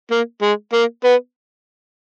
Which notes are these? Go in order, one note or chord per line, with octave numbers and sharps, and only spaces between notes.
A#3
G#3
A#3
B3